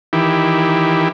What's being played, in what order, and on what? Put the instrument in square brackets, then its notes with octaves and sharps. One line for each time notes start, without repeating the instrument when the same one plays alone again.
[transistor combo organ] D#3 E3 E4 G4